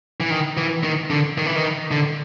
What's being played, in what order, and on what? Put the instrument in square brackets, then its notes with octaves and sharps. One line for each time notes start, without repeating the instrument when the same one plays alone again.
[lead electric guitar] E3
D#3
E3
D#3
D3
D#3
E3
D#3
D3